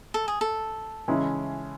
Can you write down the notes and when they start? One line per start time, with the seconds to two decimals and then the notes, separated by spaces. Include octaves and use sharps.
0.14 A4
0.28 G#4
0.41 A4
1.08 C#3 E3 G#3 C#4 E4